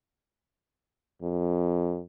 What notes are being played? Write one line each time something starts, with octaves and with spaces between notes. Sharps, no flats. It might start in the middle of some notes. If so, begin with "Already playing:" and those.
F2